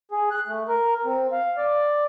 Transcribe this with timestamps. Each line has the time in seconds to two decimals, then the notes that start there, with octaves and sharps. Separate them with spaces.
0.12 G#4
0.31 F#6
0.47 A3
0.69 A#4
1.05 C4
1.32 F5
1.57 D5